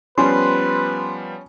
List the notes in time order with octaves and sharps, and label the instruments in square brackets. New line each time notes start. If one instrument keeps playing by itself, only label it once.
[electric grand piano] F3 G3 B3 [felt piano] C#4 [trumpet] B4 [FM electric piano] C6